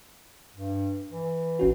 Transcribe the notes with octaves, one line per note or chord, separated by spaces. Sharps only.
G2
E3
A1 C#4 F#4